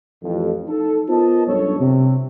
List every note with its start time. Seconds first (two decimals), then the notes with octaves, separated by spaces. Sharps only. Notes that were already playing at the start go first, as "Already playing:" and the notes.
0.22 A1 F2
0.68 D#4 A4
1.09 B3 F4 A#4 C5 D#5 A5
1.47 B1 F#2 G3 D4 A4 C#5
1.80 C3